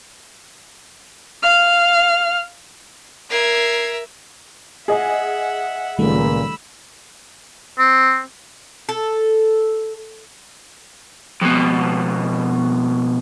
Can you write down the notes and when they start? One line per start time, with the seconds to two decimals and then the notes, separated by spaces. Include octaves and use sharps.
1.42 F5 F6
3.30 A#4 E5 G#6 C7
4.88 G#4 D#5 E5 F#5 G#5
5.99 C#2 A#2 D#3 G3 A3 B5 E6
7.78 C4
8.89 A4
11.42 F2 B2